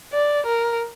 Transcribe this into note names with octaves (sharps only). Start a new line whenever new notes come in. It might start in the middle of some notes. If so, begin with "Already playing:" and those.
D5
A#4